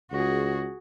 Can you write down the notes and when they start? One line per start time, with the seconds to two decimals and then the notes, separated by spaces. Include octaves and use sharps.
0.12 C#2 F#4 G#4